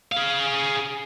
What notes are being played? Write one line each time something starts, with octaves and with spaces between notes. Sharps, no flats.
G#4 F5